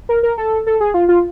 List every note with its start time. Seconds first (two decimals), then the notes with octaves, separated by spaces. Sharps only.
0.09 A#4
0.23 A#4
0.38 A4
0.67 A4
0.81 G#4
0.94 F4
1.09 F4